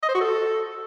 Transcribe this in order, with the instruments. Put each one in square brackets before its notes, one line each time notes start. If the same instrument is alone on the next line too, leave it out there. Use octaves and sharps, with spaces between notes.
[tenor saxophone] D#5
C5
F#4
A4